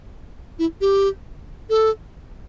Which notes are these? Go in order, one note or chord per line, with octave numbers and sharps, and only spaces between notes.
E4
G4
A4